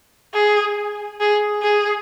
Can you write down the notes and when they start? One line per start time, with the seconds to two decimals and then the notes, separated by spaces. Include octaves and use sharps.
0.34 G#4
1.20 G#4
1.62 G#4